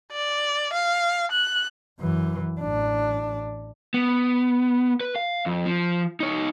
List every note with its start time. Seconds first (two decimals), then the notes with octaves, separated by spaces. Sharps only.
0.12 D5
0.73 F5
1.31 F#6
2.00 F#2 E3
2.61 A1 D4
3.94 B3
5.01 B4
5.16 F5
5.46 F2
5.66 F3
6.20 D#4 C#5